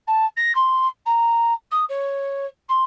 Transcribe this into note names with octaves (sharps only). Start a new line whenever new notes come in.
A5
A#6
C6
A#5
D#6
C#5
C6